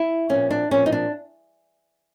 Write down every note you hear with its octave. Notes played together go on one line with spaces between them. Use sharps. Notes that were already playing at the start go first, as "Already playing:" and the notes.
Already playing: E4
A#2 F3 C#4
D4
A#2 F3 C#4
D#4
D4